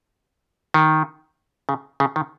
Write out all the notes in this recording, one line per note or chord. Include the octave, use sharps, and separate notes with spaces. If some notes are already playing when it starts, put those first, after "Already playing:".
D#3
C#3
C#3
D#3